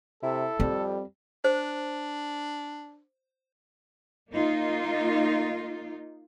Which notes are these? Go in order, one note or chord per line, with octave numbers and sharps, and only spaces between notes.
C3 E4 A4
F2 G3 C4
D4 C5
A#3 D#4 F4